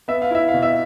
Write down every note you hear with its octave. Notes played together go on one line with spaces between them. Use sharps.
B3 E5
F5
E4 E5
F5
B2
E5